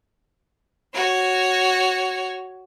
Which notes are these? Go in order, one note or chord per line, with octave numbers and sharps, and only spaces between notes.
F#4 C#5